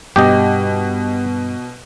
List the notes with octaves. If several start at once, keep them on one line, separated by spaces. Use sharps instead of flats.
G2 B2 G4 D#5